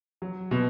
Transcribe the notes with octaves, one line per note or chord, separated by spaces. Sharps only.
F#3
B2